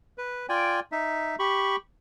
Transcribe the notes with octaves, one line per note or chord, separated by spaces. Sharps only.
B4
F4 D5 G5 G#5
D#4 E5
G4 B5 C#6